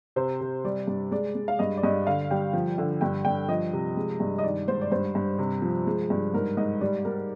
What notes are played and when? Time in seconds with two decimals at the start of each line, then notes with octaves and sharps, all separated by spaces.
0.16 C3 C5
0.41 C3
0.64 G3 D5
0.87 G2
1.11 G#3 D5
1.35 G#3
1.48 F5
1.59 G2 D#5
1.77 D5
1.83 G2 D#5
2.07 D3 F5
2.31 G3 G5
2.53 F3
2.78 D3
3.01 G2 G5
3.25 G2 G5
3.48 F3 D#5
3.73 C3
3.97 G#3
4.20 G2
4.38 D#5
4.44 D#3 D5
4.68 G#2 C5
4.81 D5
4.92 G2 C5
5.15 G2
5.39 C3
5.62 F3
5.87 G#3
6.10 G2
6.34 G#2 A#4
6.57 G#2 D#5
6.81 G3 D5
7.05 G3 A#4